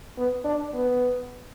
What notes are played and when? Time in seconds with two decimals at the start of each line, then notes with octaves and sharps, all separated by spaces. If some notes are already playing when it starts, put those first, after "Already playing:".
0.17 B3
0.45 D4
0.74 B3